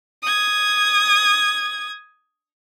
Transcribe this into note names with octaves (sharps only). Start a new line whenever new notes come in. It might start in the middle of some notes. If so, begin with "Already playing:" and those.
D#6 G#6